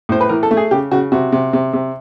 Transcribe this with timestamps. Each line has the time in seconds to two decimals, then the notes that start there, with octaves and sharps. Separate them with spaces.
0.09 A2 C5
0.21 B4
0.29 E3 A#4
0.43 A4
0.51 A3
0.57 G#4
0.71 C#3 G4
0.91 C#3 F#4
1.12 C3 F#4
1.32 C3
1.53 C3
1.73 C3